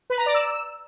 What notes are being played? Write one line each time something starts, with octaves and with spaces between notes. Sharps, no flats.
B4
A#5
D5
E6